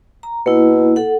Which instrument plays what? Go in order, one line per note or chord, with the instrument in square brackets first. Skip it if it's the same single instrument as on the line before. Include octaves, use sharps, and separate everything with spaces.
[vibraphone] A#5
[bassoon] B2 [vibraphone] A#3 E4
[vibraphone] A4 F#5